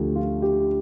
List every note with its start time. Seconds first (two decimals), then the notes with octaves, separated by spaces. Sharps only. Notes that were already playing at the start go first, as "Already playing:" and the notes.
Already playing: D2 D3 F3 G4
0.16 F4
0.42 G4